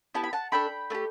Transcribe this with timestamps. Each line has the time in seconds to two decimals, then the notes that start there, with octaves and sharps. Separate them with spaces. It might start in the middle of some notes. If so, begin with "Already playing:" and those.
0.14 B3 E4 G4 A5
0.24 B5
0.33 F#5 A5
0.52 A3 D4 A4 G5 B5
0.90 A3 D4
0.95 G4